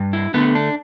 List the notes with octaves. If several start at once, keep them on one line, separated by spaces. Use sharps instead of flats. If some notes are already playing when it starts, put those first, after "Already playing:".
Already playing: G2
E4
D3 A3 B3
D4